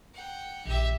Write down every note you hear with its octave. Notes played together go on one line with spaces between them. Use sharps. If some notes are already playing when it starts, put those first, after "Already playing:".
F#5 G5
A#1 D#3 G4 E5